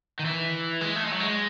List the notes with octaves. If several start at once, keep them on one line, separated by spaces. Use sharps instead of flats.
D#3
E3
G#3
A3
G#3
F#3
G#3